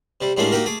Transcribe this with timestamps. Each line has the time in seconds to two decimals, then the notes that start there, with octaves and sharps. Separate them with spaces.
0.21 C3 G3
0.37 A2 G3 G#3 A#3 C#4 D4
0.52 A#3 D#4 F#4 G4 A#4
0.65 A3 G#4 D6